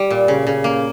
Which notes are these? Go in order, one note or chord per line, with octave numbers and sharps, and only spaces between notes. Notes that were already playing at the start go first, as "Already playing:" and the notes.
Already playing: G3
A#2
C#3
C#3
A#3